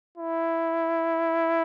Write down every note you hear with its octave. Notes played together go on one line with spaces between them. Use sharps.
E4